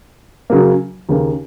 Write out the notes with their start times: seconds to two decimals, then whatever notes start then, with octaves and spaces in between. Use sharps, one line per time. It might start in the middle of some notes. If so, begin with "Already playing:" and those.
0.50 C#3 F#3 A#3
1.09 D#2 C#3 A#3